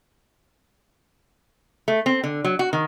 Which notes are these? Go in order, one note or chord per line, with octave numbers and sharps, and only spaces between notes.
A3
C4
D3
F#3
F#4
D#3